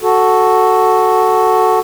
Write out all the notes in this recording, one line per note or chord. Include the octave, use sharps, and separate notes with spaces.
F#4 A4